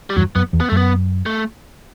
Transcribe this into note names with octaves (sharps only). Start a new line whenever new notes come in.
G3
E2 G2 F#3
F#2 B3
E2
B3
F#2 A3
B3
A3